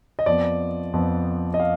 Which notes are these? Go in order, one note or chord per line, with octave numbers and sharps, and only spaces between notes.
D#5
F2 F3 B3 D5
F2 F3 B3
D#5
F5